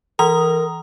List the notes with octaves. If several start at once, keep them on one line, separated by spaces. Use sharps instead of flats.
E3 A#4 A#5 D#6